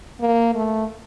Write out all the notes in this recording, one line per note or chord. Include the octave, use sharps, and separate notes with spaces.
A#3
A3